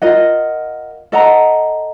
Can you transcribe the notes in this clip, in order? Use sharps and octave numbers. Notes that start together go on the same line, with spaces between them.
F4 A#4 D#5 F#5
A4 D#5 F#5 A#5